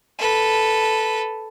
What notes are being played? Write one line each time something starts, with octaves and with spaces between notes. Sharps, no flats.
A4 B4